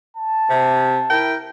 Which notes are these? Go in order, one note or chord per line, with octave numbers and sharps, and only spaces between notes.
A5
C3
E4 A#4 G5